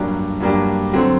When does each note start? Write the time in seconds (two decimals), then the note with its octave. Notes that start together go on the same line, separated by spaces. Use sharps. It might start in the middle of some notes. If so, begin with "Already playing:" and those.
Already playing: G2 F#3 A#3 D4 G4
0.40 G2 F#3 A#3 D4 G4
0.93 D3 F#3 C4